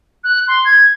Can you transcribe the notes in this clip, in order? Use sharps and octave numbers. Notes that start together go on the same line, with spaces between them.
F#6
C6
G#6